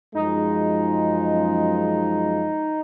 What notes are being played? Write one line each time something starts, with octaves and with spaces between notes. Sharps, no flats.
F#2 F3 G#3 D#4